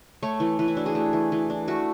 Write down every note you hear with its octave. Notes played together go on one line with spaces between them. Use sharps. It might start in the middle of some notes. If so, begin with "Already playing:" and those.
A3 C#5
E3
E3 B4
E4
D4 F#4
G#4
A3
E3
E3
D4
A3 F#4